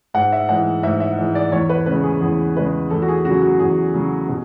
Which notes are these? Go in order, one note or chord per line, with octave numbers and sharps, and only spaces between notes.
G#2 F#5
E5
E3 G#3 F#5
G#2 E5
E5
E3 G#3
D5
E2 C#5
B4
C#3 G#3 B4
G#4
E2 G#4
C#3 G#3 B4
E2 A4
F#4
G#4
C#3 F#3 F#4
F#4
E2 G#4
C#3 F#3
B2